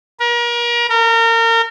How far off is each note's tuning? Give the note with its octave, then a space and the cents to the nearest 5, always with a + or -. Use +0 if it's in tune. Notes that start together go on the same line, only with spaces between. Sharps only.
A#4 +35
A#4 -30